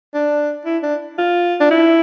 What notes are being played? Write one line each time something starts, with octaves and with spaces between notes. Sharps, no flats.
D4
E4
D4
F4
D4
E4